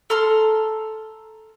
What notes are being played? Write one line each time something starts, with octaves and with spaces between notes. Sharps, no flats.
A4 A#5 C6 F6